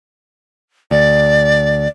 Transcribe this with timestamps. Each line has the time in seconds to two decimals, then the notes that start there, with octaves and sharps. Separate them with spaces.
0.91 D2 D5